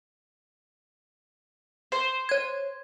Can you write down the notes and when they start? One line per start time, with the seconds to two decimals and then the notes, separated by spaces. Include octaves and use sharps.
1.92 C5
2.29 C#5 G#6